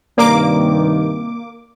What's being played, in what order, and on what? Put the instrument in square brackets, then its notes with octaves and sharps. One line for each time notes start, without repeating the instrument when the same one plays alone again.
[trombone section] G2 C3 D#3 [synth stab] A#3 D6 [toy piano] D5 A#5